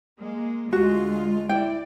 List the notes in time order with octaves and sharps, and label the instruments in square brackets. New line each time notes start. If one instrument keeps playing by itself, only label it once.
[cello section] G#3 A#3
[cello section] D2 F4 [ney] G#3 [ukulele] F#4
[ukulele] E4 G5 [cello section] D5